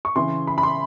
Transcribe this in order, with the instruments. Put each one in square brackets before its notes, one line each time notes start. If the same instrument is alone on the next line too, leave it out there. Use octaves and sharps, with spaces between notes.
[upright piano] C#6
C#3 E3 C6
B5
B5
C6